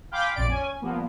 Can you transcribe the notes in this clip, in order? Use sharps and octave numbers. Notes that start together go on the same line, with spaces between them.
F5 G5 G#5 B5 C6 D6
A#1 F2 D5 D7
C#4 G#5
F3 G3 A#3 B3